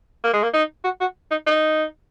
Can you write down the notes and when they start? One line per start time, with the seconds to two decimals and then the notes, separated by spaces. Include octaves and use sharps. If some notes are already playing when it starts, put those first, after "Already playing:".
0.24 A#3
0.34 G#3
0.43 A#3
0.54 D#4
0.84 F#4
1.01 F#4
1.31 D#4
1.47 D#4